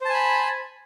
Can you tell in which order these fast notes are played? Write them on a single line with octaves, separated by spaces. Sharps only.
C5 A5 G#5 B5